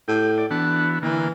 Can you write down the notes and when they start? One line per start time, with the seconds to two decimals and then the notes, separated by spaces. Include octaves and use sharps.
0.08 A2 G4
0.38 D5
0.51 E3 B3 D4 F#4
1.03 D3 E3 A#3